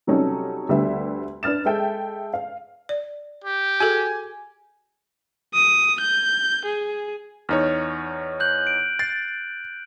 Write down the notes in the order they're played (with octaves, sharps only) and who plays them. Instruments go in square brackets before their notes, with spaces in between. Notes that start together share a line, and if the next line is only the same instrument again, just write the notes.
[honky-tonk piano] C3 F#3 G3 C#4 D#4 A4
D2 D3 G3 B3 E5
D4 B4 F6 A6 E7
G#3 A4 E5 G5
F5
[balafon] D5
[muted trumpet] G4
[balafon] F#4 G#4 A4 [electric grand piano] G#5
[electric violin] D#6
G6
G#4
[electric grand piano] E2 D#4 C#5 [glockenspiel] F6
[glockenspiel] F#6 G6 F#7
D7
[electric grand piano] A6 C7